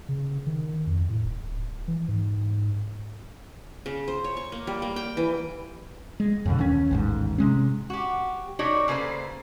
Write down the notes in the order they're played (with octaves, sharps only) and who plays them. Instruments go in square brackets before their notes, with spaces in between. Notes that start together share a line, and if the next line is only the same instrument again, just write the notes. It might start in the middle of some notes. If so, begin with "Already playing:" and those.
[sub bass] C#3
D#3
F2
A2
D1
E3
G#2
[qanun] C#3
C5
C#5
C#6
A#3
G3
A#3
G5
E3
[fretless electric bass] G#3
F2 B2 D3
D#2 C#4
A1 D#2 G#2
C3 G#3 C#4
[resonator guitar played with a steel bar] F#4 G4
A3 D#4 F#4 G4 C#5 D5
C#3 A#3 A4 B4 C5